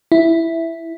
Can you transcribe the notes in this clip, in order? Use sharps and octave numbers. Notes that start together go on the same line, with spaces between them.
E4